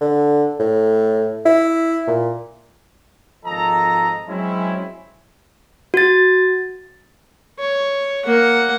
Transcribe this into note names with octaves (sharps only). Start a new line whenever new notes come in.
D3
A2
E4
A#2
G#1 F3 A4 D#5 A#5
F#3 G#3 C4 C#4 E4
F#4 A6
C#5
A#3 F#5